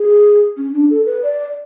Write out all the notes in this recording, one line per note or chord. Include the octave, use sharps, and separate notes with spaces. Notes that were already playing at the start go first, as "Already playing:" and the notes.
Already playing: G#4
C#4
D4
A4
B4
D5